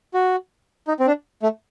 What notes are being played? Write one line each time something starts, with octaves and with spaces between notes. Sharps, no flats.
F#4
D#4
C4
D4
A3